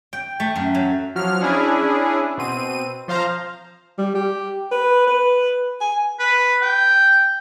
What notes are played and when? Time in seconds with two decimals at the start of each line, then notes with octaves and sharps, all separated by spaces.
0.13 G5
0.40 A3
0.56 F#2
0.75 F#3
1.15 F3 F#3 F6
1.40 C#4 D4 E4 G#4
2.38 B2 C4 D#7
3.08 F3 C5 F5 A#5
3.98 G3
4.15 G4
4.71 B4
5.07 B4
5.81 G#5
6.19 B4
6.62 G5